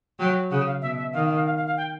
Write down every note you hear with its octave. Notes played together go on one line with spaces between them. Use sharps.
F#3 G5
C#3 F#5
F5
B2 E5
E5
D#3 F5
F5
F5
F5
F5
F5
G5